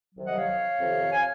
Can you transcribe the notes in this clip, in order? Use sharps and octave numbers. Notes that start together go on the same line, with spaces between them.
C2 C3 D#3 F#3
D#5 F#5
C#5 F5
F2 C3 D#3
F5 G#5